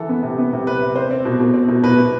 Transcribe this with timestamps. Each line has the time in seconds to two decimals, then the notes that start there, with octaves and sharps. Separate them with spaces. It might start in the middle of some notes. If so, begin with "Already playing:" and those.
Already playing: E3 A4
0.09 B3
0.23 C3
0.39 B3
0.53 C3
0.67 C3 B4
0.81 C3
0.96 C4 C5
1.11 C4
1.25 B2
1.40 B2
1.54 C4
1.68 B2
1.84 B2 B4
1.98 B2